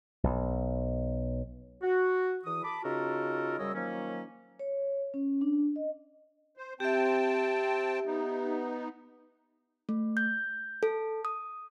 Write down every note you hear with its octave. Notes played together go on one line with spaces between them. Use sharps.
B1
F#4
E2 E3 D#6
A5 B5 D6
C#3 D#4 F4 F#4 A4 A#4
F#2 C#3 G3 C#5 D#5 E6
D#3 F3 F#3 A#3 C#4
C#5
C#4
D4
D#5
C5
C4 G4 E5 G5 A5
B3 D#4
A3
G6
A4
D#6